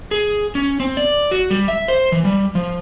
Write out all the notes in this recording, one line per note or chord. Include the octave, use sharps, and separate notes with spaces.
G#4
C#4
C4
D5
F#4
G3
E5
C5
E3
G3
F3